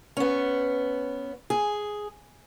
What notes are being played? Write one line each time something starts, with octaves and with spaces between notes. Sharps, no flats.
B3 C#4
G#4